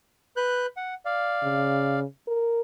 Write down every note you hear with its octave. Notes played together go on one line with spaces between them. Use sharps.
B4 F#6 G6
F#5
D5 F5
C#3
A#4